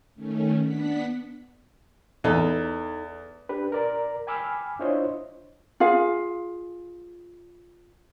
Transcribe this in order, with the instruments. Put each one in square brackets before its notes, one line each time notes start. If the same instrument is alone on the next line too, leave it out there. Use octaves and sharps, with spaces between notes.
[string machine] D#3 A3 C#4
B3 D4 F#5 B6
[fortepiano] E2 [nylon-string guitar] D#4 A4
[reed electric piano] D4 G4 B4
A#4 D5 A#5
G5 G#5 B5 D6 E6 F6
D4 E4 F4 C5 C#5 D#5
[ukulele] F4 G#4 F5